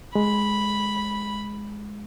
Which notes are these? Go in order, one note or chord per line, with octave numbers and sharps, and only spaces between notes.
G#3 B5